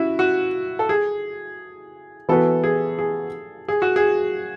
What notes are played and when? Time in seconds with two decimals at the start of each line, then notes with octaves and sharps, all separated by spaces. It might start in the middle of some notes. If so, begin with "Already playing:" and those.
Already playing: C#4 E4 F#4
0.19 F#4
0.79 A4
0.89 G#4
2.29 E3 B3 F#4 A4 B4
2.64 G#4
2.99 G#4
3.68 G#4
3.82 F#4
3.96 G#4